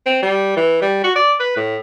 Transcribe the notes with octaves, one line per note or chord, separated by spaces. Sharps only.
C4
G3
E3
G3
F#4
D5
B4
A2